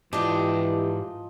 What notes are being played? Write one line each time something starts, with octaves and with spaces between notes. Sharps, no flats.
G#2 E3 F3 D4 G4 D#5 A5